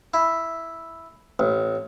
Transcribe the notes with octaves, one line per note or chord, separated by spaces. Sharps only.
E4
A1